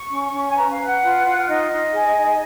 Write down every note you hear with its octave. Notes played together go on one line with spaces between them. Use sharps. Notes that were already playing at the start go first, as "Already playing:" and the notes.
Already playing: C#6
C#4
C#4
G#5
B4 A#5
F5
B4
F#5
F4
F4
D#4 D#5
D#4
G#4
D#4